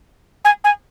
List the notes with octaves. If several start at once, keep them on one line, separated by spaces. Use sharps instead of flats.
G#5
G#5